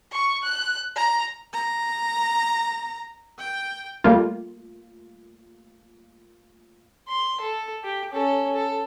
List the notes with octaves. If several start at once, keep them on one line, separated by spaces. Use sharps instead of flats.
C#6
F#6
A#5
A#5
G5
G3 A3 A#3 F4
C6
A4
G4
C#4 A4
A4